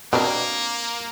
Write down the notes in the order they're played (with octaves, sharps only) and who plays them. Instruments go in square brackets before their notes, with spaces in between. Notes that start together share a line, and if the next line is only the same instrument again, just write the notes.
[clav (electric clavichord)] B2 [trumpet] A#3 [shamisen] C4 D4 A#4